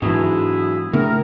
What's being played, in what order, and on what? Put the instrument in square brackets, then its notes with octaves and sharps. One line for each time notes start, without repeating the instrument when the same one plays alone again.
[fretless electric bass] G#2 E3 [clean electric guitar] B2 F#3 G#3 [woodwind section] D4 E4 G#4
[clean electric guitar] A2 [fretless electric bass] C#3 B3 D4 [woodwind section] A#4